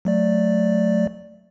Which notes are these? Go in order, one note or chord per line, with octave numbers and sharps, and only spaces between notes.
F#3 A3 D5